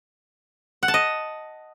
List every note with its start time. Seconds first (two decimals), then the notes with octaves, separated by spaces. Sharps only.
0.83 F#5
0.88 A5
0.94 D#5